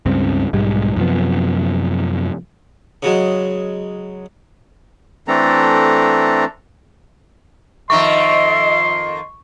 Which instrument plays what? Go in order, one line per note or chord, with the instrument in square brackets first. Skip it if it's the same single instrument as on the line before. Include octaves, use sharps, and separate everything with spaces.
[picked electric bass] C#2 G2 C#3 C4
B1 G#2 G3 G#3
F#2 C3 F3 B3
[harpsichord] C#3 F#3 G#3
[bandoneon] E3 A3 C4 D4 A4 A#5
[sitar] F2 D#3 A#3 [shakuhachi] E5 [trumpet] C6 [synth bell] C#6